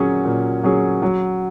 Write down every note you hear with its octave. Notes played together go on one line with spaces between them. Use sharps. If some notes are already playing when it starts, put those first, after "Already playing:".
Already playing: A#2 F#3 C#4 G#4
A#2
F#3 C#4 G#4
F#3